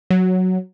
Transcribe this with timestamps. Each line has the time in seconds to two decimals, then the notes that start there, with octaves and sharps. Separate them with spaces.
0.10 F#3